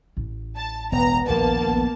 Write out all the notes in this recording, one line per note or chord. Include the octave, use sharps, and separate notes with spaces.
A1
A5
E1 B3 A#5
A#1 D#2 A#3 A5